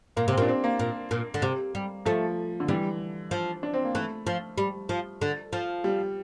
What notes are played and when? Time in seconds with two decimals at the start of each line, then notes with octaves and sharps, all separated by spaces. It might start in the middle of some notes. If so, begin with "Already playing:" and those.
0.16 A#2 A#3
0.28 C3 C4
0.37 A#2 D4
0.48 C4
0.64 A#3
0.79 A#2
1.11 A#2
1.34 D3
1.42 C3
1.75 G3
2.06 F3 A3
2.60 D3
2.68 E3 G3
3.31 F3
3.63 D4
3.74 C4
3.85 A#3
3.95 E3 A3
4.27 F3
4.58 G3
4.89 F3
5.21 D3
5.53 F3
5.84 G3